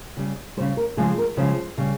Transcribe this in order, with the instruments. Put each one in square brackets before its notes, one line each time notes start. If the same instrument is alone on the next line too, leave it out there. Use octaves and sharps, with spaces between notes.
[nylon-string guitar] C#3 G3
C#3 G3 C5
A#4
C#3 F3 G#3 G#4
A#4
C#3 F3 G#3 C5
C#3 G3